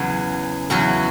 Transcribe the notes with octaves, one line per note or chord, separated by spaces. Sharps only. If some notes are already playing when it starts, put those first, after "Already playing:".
Already playing: E2 C#3 F#3
E2 C#3 F#3 F#4